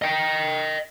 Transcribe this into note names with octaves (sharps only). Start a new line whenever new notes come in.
D#5 G5